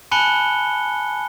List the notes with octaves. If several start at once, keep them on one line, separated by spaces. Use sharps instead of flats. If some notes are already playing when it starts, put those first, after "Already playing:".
G#5 A5 B5 F#6 C#7 G7